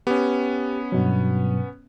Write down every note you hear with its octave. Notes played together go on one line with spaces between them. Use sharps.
B3 C#4 G4
G2 B2 F#3